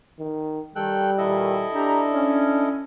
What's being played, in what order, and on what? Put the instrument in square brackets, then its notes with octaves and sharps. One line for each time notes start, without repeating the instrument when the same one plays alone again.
[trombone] D#3
[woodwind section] D#3 [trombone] G3 [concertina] A4 G5 F#6
[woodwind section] A#2 D#3 [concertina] E4 A4 D#5
[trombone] D4 [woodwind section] G4 A#5
[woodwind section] C#4